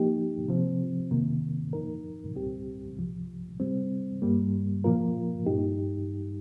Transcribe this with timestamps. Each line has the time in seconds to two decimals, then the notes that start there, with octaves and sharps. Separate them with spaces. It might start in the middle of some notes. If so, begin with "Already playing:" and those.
Already playing: F3 A#3 D#4 G4
0.48 C3 F3 C4
1.11 F2 C3 D#3 A#3
1.73 F2 F3 D#4 A#4
2.35 C2 A#2 G3 C4 G4
2.97 C2 C3 F3
3.60 C3 G3 C4
4.22 G2 G3 A#3
4.84 A#2 F3 A#3 F4 A#4
5.46 G2 G3 D#4 G4